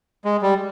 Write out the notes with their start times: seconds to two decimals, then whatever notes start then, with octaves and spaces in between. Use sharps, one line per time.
0.25 G#3
0.42 G3